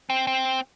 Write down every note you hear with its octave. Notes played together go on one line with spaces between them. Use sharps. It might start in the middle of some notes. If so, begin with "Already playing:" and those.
C4
C4